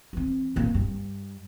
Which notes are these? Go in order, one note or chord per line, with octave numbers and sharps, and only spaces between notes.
E3 C4
G#1 A#3
G2